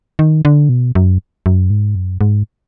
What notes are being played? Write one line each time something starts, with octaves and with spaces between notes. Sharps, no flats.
D#3
D3
B2
F#2
F#2
G#2
F#2
G#2